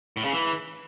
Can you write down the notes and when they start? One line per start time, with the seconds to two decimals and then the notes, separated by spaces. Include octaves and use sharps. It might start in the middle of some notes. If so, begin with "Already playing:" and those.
0.17 A2
0.24 C#3
0.32 E3